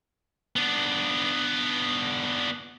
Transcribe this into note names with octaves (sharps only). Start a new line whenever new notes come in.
B3 D4